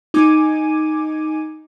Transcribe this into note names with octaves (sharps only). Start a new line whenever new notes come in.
D#4 G#5 D6 G#6 D#7